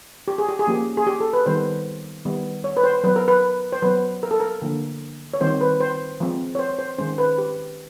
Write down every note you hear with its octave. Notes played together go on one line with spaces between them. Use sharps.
G4
G#4
G4
G#4
F3 A#3 C#4 G4
G#4
G4
A4
B4
D#3 G3 B3 C5
D#3 G3 B3
C#5
B4
C5
F#3 B3 B4
A#4
B4
C5
F#3 B3 B4
A#4
A4
A#4
D3 F3 A#3
C#5
D#3 G3 C4 C5
B4
C5
F3 G#3 C4
C#5
C5
C5
D#3 G#3 C#4 C5
B4
G4